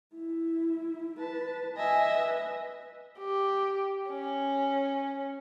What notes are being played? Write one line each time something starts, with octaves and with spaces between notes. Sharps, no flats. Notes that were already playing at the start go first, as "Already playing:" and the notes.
E4
B4 A5
D#5 E5 G#5
B4
G4
C#4